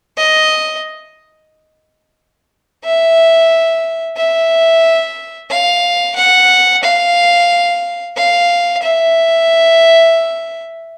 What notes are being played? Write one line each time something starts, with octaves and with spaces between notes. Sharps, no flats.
D#5
E5
E5
F5
F#5
F5
F5
E5